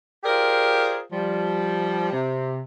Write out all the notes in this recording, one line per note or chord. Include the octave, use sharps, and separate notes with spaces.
F4 G4 G#4 A#4 C5 D5
F3 G3
C3